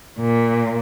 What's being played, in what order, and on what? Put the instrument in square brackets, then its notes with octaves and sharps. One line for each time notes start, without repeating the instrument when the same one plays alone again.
[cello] A#2